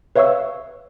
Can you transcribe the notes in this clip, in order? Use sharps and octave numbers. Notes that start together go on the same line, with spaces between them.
B4 C#5 E5 F5 C#6 E6